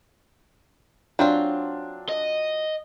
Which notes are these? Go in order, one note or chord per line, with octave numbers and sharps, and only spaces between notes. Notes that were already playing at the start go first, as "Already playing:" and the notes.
F#3 C4 D4 F4
D#5